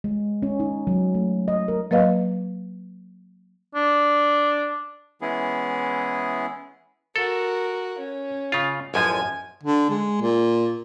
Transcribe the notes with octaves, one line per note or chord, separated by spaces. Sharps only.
G#3
C#4
D#4
F#3
A3
D#5
A#4
F#3 A#3 B4 D#5 F5
D4
E3 G#3 B3 C#4 E4 G#4
F#4 A4 A#4
C#4
C#3 F4
A1 F#2 F3 G#5
D3
G#3
A#2